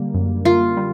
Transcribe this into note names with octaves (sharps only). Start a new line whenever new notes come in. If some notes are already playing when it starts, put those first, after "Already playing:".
Already playing: D3 G3 A#3
F#2
A#3 F4
G3